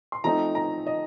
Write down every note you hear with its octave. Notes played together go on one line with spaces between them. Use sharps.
C6
F3 A3 C4 D#4 A#5
A#5
D#5